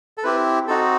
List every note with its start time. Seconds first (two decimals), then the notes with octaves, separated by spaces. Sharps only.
0.18 A4
0.23 C4 E4 G4 B4
0.68 C4 D#4 F#4 A4